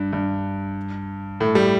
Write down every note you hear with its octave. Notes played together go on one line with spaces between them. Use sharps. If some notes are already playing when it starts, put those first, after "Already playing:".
Already playing: G2
G2
A2
G3